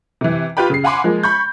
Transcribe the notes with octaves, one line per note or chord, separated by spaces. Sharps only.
C3 E3
F4 G4 B4 G5 B5
C#3 C7
F5 F#5 G#5 B5 C6 D6
F3 G#3 A#3
B5 C#6 G6